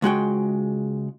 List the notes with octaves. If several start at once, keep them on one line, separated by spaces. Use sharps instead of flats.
C#2 G#3 F#4 G5